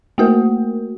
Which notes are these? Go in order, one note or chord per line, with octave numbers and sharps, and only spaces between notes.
A3 A#3 F#4 A#4